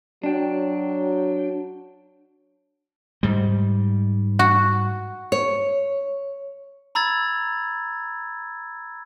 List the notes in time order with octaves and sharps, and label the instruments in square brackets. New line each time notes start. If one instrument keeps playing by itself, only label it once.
[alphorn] F#3 [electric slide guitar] D4 G5
[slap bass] G#2 G3
[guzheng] F#4
[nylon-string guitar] C#5
[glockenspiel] A#5 B5 E6 G#6 A6